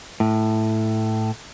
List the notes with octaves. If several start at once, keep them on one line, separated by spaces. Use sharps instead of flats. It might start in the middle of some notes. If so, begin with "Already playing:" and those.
A2